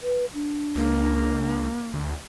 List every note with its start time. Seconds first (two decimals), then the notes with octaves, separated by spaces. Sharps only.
0.01 B4
0.34 D4
0.76 C#2 A#3
1.94 D2